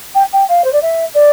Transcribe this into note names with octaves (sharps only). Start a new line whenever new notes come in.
G5
G5
F5
C5
D5
E5
D5